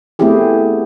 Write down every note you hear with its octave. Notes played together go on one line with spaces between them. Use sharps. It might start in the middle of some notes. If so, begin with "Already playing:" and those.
A3 B3 C4 E4 G4 G#4